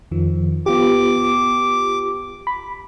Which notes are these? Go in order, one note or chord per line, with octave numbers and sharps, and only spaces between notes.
F2 D#3 F3
B3 F4 G4 D6
B5